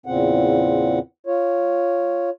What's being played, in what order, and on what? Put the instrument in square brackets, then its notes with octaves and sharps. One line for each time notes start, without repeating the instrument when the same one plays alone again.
[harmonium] E2 A#2 C#3 C4 F#5
F4 C#5